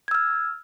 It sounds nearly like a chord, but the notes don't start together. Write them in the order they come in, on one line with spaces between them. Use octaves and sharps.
G#6 E6 F6